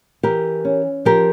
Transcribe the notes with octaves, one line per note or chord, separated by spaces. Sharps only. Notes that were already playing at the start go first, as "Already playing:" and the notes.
E3 G4 A#4
C#4
F3 G4 A#4